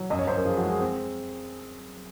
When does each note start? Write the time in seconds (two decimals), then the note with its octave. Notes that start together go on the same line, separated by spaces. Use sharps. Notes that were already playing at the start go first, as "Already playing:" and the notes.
Already playing: F#3
0.10 F#2 D#5
0.19 C#5
0.27 F#2 C5
0.36 A#4
0.45 F3 G#4
0.57 F#4
0.62 G#3
0.69 G#4
0.80 C4